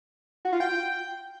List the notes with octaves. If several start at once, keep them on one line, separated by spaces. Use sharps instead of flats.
F#4
F4
G5